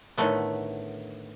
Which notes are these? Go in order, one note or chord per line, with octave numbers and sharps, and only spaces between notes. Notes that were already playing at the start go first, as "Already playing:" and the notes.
A2 D3 D#3 A3 B3